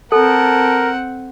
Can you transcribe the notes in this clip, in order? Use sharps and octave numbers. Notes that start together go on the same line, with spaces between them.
C4 A4 A#4 F#5 A5